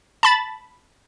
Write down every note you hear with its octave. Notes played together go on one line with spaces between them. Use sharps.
A5 B5 A6